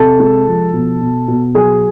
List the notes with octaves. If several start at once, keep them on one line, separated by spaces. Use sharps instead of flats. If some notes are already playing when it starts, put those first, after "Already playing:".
Already playing: C3 A4 A5
G#3
F3
B2
B2
B2
F#3 G#4 G#5